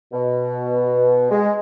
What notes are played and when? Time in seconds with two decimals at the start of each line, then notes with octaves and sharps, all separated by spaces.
0.12 B2
1.31 G#3